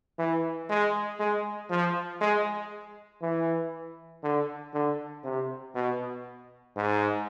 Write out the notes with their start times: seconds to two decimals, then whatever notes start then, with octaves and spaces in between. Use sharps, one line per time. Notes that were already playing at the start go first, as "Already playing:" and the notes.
0.19 E3
0.70 G#3
1.20 G#3
1.70 F3
2.21 G#3
3.22 E3
4.23 D3
4.74 D3
5.24 C3
5.75 B2
6.76 G#2